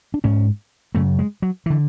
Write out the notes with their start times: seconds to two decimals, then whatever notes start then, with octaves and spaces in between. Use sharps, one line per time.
0.14 D4
0.24 G#2 C#4
0.95 F#2 C#3 A3
1.19 G#3
1.42 F#3
1.66 D3 E3